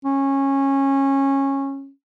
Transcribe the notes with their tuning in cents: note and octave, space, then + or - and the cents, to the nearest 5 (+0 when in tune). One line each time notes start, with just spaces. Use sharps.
C#4 -20